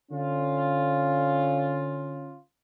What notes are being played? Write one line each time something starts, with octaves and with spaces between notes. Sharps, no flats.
D3 C#4 F4